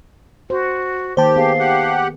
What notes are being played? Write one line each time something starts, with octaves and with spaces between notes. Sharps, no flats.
F#4 C5
D#3 A#3 G4 C5 A5
B3 G#4 F5
G4 F#5